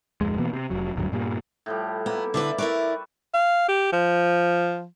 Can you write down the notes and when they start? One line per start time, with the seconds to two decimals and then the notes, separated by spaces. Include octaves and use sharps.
0.21 D1 F2 G#3
0.39 B2 E3 A#3 B3
0.53 C3
0.70 F1 F#3
0.96 D1 D2 G2 F#3
1.12 G2 A#2 G3
1.66 A2 F3 G3
2.06 A#3 B3 E4 E5
2.34 D3 E4 B4 D5 E5 D6
2.58 E4 A#4 B4 D5 C#6
3.34 F5
3.68 G4
3.93 F3